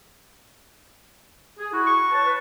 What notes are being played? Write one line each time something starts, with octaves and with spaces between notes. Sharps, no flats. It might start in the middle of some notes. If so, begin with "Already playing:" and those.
G#4
E4 F#4
C#6
B4 C#5 A5
B4